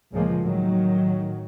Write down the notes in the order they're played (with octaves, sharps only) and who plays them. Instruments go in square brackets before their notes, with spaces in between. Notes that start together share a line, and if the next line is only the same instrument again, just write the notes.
[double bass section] C#2 A#2 C#3 F3 G#3 A#3
A2 D#3 F#3